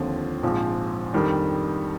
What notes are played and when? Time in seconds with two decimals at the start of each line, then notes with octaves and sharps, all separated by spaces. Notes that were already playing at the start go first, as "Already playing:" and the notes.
Already playing: D#2 D3 F3 C4 F4
0.43 A#1 G#2 F3 C4
1.13 F2 D#3 G3 D4